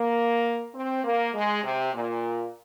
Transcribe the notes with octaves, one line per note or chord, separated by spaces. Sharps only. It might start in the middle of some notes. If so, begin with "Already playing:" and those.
Already playing: A#3
C4
A#3
G#3
C3
A#2